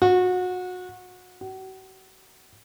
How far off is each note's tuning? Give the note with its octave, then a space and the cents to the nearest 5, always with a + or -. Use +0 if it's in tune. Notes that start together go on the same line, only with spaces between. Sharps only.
F#4 -25
F#4 +40